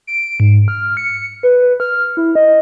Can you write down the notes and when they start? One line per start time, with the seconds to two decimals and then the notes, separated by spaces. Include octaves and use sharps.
0.07 D7
0.40 G#2
0.68 F6
0.97 C#7
1.43 B4
1.62 B4
1.80 F6
2.17 E4
2.35 D#5